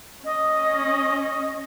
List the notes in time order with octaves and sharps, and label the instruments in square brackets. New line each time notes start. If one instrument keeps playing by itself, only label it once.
[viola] C#4 [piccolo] D#5